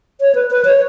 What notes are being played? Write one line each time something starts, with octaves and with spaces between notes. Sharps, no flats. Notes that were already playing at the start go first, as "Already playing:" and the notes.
C#5
B4
B4
C#5